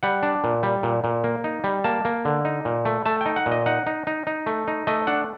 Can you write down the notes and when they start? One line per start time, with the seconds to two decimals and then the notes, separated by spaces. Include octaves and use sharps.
0.03 G3 F#5
0.23 D4
0.44 A#2
0.63 G3
0.83 A#2
1.04 A#2
1.24 A#3
1.44 D#4
1.64 G3
1.84 A#3 A5
2.05 A#3
2.25 D3
2.45 D#4
2.65 A#2
2.85 A3
3.05 A3 A5
3.21 D#4 G5
3.36 F#5
3.46 A#2
3.51 D#5
3.66 D#4 F#5
3.87 D#4
4.07 D#4
4.27 D#4
4.46 A3
4.68 D#4
4.87 A3 D#5
5.07 D4 F#5